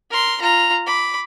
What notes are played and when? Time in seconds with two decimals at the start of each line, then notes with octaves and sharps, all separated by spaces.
0.10 A#4 C6
0.41 F4 A#5
0.87 B5 D6